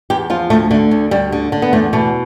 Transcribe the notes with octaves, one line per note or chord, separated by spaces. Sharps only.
E2 G4
F3 F4
D2 A3
D3 A3
D2
D2 G3
D3
D3
B3
E2 A3
B2 A3